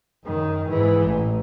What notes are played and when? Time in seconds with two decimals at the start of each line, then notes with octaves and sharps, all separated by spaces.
0.25 F#2 D#3
0.69 G#2 E3
1.02 A1